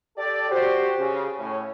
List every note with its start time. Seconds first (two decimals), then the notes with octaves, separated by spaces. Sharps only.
0.17 G4 A4 D5
0.50 F#4 G4 C5
0.99 C#3
1.40 A2 C#4